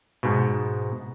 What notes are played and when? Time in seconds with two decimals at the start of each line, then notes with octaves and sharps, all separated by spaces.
0.23 G#2 B2